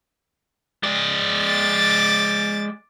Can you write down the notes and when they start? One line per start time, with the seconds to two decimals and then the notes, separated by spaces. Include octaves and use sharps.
0.83 G#3 D5
1.42 D6 A6